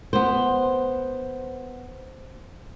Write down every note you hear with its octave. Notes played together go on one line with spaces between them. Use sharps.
B3 C5